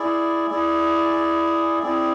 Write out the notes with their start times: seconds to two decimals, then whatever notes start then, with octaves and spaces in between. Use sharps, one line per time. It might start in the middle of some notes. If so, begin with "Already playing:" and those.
Already playing: E4 G#4 D5
0.50 E4 G#4 D5
1.83 C4 E4 G#4 D5